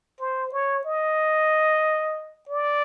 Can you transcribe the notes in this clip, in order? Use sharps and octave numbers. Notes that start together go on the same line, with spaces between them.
C5
C#5
D#5
D5